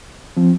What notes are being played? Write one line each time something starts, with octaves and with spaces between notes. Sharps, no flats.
F3 C4